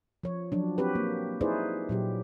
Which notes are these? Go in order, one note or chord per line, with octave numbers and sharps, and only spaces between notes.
F3 C#5
F3 F#3 D4
C4 F#4 G4 B4
A#3
D#4 E4 G#4 B4 C5 D5
A#2 F#3 G4